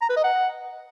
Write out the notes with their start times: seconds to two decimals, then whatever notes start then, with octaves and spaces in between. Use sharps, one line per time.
0.02 A#5
0.09 B4
0.17 D#5
0.24 F#5